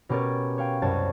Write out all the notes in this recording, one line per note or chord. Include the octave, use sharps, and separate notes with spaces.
B2 C#4 G4 A#4 C#5 A6
C#5 F5 G5
C2 F#2 C#5 A5 A6